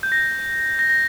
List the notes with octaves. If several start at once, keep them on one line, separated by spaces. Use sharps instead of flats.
G6
A#6
A#6
A#6